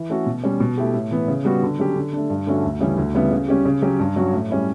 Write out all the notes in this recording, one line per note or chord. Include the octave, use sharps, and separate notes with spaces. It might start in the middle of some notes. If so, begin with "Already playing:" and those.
Already playing: E3
A3 C#4 F#4 A4
B2
G3 C#4
B2
A3 E4 G4
A2
E3 B3
C#3
G3 B3 F#4
D3
F#3 C#4 G4
D3
A3 D4
G2
D3 A3 C#4 F#4
D2
C#3 E3 G3 C#4
D2
C#3 G3 B3 E4
C#3
G3 C#4 G4
C#3
F#3 C#4 G4
G2
F#3 C#4 F#4
A2
G3 C#4 E4